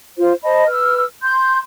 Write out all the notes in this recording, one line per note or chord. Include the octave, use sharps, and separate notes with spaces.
F4 C5
C5 D#5 A5 B5
B4 E6 F6
C6 G6